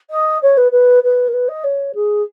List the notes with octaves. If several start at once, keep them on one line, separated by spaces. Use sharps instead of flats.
D#5
C#5
B4
B4
B4
A#4
B4
D#5
C#5
G#4